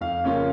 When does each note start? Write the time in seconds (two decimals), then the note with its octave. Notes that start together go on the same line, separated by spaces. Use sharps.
0.01 F2 F5
0.24 C#3 A#3 C#4 F4